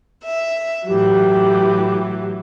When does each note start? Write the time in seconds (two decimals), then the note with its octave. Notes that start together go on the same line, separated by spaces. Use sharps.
0.23 E5
0.87 A2 E3 F#3 G4